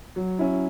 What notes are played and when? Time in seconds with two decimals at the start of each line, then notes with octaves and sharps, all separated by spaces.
0.16 F#3
0.39 C#4 E4